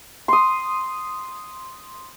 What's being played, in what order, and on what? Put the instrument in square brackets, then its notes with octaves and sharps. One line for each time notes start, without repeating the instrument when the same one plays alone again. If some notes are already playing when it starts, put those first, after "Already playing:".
[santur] C6 D#6